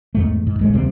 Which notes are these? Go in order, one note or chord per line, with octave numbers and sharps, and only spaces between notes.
E2 G#2 A3
G#2
A1 G#3 A3
D#2 C3 G3 C4